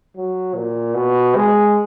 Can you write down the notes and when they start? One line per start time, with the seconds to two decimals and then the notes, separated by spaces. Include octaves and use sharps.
0.16 F#3
0.55 A#2
0.95 B2
1.36 G#3